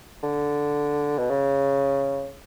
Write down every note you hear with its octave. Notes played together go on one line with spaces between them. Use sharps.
D3
B2
C#3